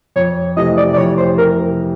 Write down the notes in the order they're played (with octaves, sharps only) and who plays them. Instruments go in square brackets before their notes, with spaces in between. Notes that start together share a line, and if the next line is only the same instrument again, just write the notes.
[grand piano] F2 [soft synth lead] C#5
[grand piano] C3 E3 A3 [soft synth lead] D#5
[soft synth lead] D5
D5
[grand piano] F2 [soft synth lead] C#5
[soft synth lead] C5
[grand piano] C3 [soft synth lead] A#4